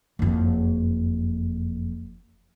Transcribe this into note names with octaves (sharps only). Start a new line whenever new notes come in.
F#1 F2